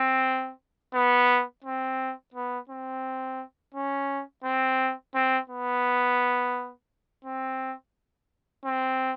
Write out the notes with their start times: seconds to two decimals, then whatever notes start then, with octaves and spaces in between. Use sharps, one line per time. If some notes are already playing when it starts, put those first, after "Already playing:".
Already playing: C4
0.94 B3
1.64 C4
2.34 B3
2.70 C4
3.74 C#4
4.44 C4
5.14 C4
5.49 B3
7.25 C4
8.65 C4